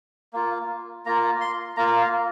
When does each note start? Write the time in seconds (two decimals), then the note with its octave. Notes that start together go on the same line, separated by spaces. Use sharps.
0.33 A#3 F4
1.06 A#3 F4 A#5
1.41 C6
1.77 A#3 F4 A#5
2.02 F5